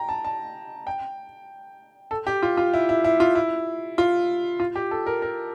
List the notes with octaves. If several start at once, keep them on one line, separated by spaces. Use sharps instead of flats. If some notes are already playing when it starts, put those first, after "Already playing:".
Already playing: G5 A#5
A5
A5
G5
A4
G4
F4
F4
E4
E4
E4
F4
E4
F4
F4
G4
A4
A#4
A#4